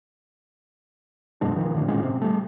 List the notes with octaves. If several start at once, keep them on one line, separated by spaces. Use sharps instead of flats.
F#2 B2 G#3 D4
D#3 F3
A2 D3
G#1 A#2 G#3 C#4
C3
G3 A3